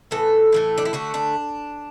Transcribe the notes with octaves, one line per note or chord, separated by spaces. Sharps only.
A2 E3 B3 A4
A2 E3 A3
D4
E4
D3 A3 F#4
D4